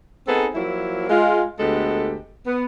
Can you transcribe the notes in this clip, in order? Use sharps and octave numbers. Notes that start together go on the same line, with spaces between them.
B3 C4 D#4 G#4 A4
F3 F#3 A#3 E4
G#3 F4
D2 G#3 B3 G4 A4
B3